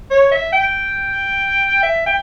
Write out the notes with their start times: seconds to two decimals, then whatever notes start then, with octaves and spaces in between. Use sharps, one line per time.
0.11 C#5
0.32 E5
0.53 G5
1.83 E5
2.06 G5